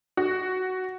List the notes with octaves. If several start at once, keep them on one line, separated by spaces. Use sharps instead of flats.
F#4